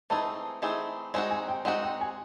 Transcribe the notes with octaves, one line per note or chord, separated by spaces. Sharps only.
E3 A3 C4 D#4 G#4 A5
E3 A3 C4 D#4 G#4
G#3 C4 D#4 F#4 G#5
G#5
G5
G#3 C4 D#4 F#4 F#5
G5
G#5